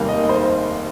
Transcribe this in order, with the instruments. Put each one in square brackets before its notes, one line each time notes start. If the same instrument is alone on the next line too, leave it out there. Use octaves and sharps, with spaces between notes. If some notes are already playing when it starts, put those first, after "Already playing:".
Already playing: [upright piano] F1 D#2 D#3 G3 A#3 F5
D#5
D#5
C5